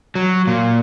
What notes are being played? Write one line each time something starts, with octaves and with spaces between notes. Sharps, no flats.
F#3
A#2